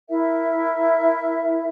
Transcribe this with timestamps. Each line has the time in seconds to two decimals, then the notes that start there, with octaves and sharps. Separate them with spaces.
0.09 E4 A#4 E5